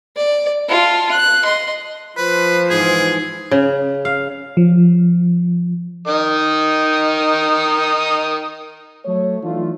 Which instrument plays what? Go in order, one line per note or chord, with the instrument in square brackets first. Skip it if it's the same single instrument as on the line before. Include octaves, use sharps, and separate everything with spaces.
[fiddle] D5
F4 A5
F#6
D#5 C6
[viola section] F3 C5 [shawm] B4
[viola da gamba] G#2 E3 [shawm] G#4
[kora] C#3
F5
[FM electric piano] F3
[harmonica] D#3 D#4 D#6
[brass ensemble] F#3 A3 C#5
E3 F#3 A3 D4 D#4 F4